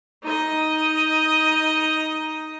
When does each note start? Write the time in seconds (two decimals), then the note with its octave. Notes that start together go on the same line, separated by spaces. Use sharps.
0.23 D#4 D#5